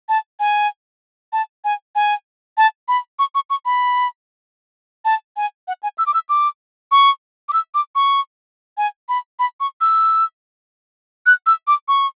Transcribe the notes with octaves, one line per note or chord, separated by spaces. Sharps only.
A5
G#5
A5
G#5
G#5
A5
B5
C#6
C#6
C#6
B5
A5
G#5
F#5
G#5
E6
D6
E6
D6
C#6
D6
E6
D6
C#6
G#5
B5
B5
C#6
E6
F#6
E6
D6
C#6